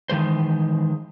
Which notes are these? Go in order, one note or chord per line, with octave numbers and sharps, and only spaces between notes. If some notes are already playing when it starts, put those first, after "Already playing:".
D#3 E3 G#3 C5